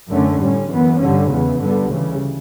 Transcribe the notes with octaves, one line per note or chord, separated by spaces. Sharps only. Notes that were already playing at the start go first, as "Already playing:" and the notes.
F#2 D3 A3 C#4
A2 G3 C#4
F#2 E3 B3
G2 D3 G3 C#4
E2 C#3 E3 B3
G2 D3 G3 B3
D2 C#3 E3 G3